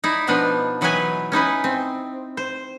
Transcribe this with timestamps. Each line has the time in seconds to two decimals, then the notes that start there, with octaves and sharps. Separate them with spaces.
0.04 D#4 E4 D5
0.27 B2 F3 B3 D4 D#4
0.81 E3 F#3 D#4 E4 B4 G#5
1.32 C#4 D#4 E4 B4
1.64 C4
2.37 C5